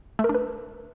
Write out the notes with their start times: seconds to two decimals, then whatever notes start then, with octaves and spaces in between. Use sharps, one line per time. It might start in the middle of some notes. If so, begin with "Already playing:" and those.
0.19 A3
0.24 A#4
0.29 D4
0.35 B4